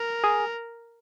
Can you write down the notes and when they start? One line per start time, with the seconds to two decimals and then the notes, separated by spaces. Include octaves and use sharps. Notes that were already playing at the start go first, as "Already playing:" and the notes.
Already playing: A#4
0.24 G#4